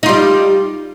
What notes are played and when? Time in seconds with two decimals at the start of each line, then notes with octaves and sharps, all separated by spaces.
0.03 D#4
0.06 F4
0.09 G3